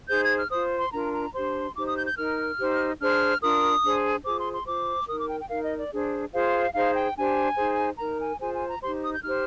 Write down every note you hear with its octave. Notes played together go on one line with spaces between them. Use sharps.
D#4 G#4 C5 G6
G#6
F6
F4 C5 D#6
C6
D4 F4 A#4 A#5
A#5
D4 G4 C5 C6
D#4 G4 C5 D6
D#6
G6
G6
D#4 A#4 F6
D#4 G4 C5
D4 G#4 C5 F6
D4 F4 A#4 D#6
D4 G#4 C5
F4 G#4 C5 D6
C6
C6
F4 C5 D6
D#4 A#4 D#6
D6
G5
G5
D#4 A#4 F5
D#5
D5
D4 G#4 C5
F4 G#4 C5 F5
D#4 G#4 C5 F5
G5
D4 G4 C5 G#5
D#4 G#4 C5
D#4 A#4 A#5
G#5
F4 G#4 C5 G#5
G#5
A#5
D#4 G4 C5 C6
D#6
G6
D#4 G4 C5 F6